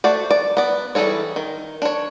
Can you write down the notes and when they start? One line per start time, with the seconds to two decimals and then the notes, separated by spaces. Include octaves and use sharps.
0.04 A3 F#4 C5 D5
0.31 D5
0.57 B3 D5
0.95 E3 G3 G#4 A4 C#5
1.36 D#3
1.82 D4 C#5